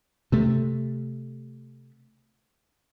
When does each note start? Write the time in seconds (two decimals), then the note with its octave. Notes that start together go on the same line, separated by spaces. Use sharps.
0.32 C3 A3